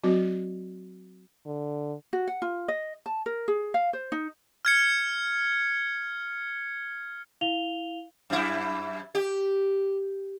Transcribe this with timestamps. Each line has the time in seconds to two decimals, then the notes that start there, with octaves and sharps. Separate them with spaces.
0.03 F#3 C4 F#4 D#5
1.46 D3
2.13 F#4
2.27 F#5
2.42 F4
2.68 D#5
3.06 A5
3.26 A#4
3.48 G#4
3.74 F5
3.93 C5
4.12 D#4
4.65 F6 G#6 C#7
7.41 E4 F5 F7 G7
8.30 F#2 E4
9.15 G4